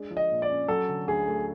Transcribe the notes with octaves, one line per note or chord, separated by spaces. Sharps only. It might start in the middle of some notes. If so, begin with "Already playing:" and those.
Already playing: G#3 D4
F3
D#5
A#2
D5
C#4
F#3 A4
D3
D2 G#4
A3